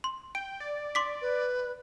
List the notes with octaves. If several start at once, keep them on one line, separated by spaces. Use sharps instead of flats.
C6
G5 D7
D5
C6 D6 B6
B4